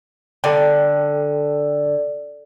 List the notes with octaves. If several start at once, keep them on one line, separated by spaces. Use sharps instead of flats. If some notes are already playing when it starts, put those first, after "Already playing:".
D3 A4 D5 G5